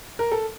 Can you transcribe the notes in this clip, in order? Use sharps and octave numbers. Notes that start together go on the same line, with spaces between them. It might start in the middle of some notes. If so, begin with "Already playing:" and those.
A#4
A4